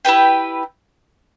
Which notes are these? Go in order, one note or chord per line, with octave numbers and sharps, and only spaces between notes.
E4 G4 B4 G5